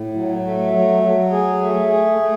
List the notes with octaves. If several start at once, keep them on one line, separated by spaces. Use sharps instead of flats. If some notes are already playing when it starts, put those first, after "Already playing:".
Already playing: A2
F#3
A3
F#3
F#3
G#4
A3
G#4
A3